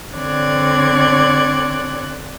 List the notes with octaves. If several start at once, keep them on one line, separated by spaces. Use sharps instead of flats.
D3 C4 C#5 D5 F#6 G#6